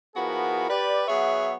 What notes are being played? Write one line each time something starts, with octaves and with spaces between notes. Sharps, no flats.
F3 B3 E4 F#4 G#4 A#4
G4 B4 D5
F#3 B3 G#4 C#5 E5 F#5